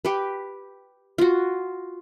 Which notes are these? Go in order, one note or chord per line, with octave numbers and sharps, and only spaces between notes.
G4 B4
F4 F#4